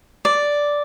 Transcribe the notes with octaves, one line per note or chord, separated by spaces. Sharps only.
D5